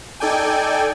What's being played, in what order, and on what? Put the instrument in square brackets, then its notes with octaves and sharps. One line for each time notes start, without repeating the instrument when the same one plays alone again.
[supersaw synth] D#4 A4 D5 G5 G#5